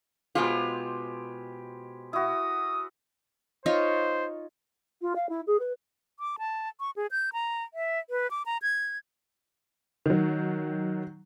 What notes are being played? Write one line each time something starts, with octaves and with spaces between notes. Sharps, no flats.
B2 G#3 F4 G4 G#4 C5
E4 F#4 D#6
D#4 F4 C5 C#5
F4
F5
E4
G#4
B4
D6
A5
C#6
G#4
G6
A#5
E5
B4
D6
A#5
G#6
D#3 F#3